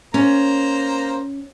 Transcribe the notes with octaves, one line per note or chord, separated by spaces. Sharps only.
A#3 C#4 C5 A#5